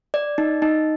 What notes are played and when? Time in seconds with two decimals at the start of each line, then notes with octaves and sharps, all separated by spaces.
0.14 D5
0.38 D#4
0.62 D#4